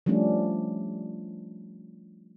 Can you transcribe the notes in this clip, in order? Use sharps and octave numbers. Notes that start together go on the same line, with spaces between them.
F3 G3 A3 C#4 D4